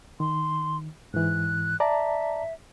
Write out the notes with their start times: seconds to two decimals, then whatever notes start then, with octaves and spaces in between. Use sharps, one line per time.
0.20 D#3 C6
1.14 G#2 E3 F#6
1.80 D5 E5 A5 A#5